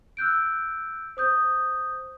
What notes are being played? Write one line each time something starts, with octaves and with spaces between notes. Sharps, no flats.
E6 F#6 G6 D7
C5 D#6 G6